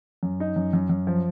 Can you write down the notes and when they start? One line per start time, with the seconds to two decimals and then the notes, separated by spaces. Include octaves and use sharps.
0.23 F#2
0.40 D#4
0.56 F#2
0.73 F#2
0.89 F#2
1.07 F3